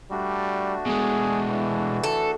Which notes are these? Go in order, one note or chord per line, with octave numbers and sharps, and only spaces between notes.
G3 A3 D4 F#4
B2 G#3 G#4
E3
A4